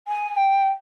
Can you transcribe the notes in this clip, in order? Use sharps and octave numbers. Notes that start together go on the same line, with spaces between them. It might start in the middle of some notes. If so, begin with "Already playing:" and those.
G#5
G5